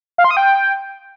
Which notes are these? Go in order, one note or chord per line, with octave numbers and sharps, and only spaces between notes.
F5
C6
D#6
G5